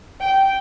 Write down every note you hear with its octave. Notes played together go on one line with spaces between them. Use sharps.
G5